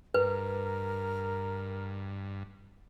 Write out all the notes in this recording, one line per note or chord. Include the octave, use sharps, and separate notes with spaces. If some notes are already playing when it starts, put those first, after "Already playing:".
G2 A#4 B4